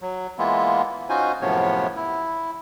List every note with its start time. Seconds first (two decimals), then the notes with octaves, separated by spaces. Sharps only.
0.01 F#3
0.38 E3 G#3 A#3 B3 E4 F4
1.09 C#4 D#4 F4 F#4 C5 G#5
1.41 F#2 A2 C3 F3 B3 C#5
1.96 E4